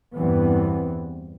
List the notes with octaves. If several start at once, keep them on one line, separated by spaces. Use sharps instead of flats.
E2 G2 E3 B3 C4